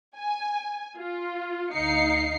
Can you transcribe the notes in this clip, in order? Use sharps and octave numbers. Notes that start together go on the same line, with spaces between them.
G#5
F4
D2 D#4 F5 C7 C#7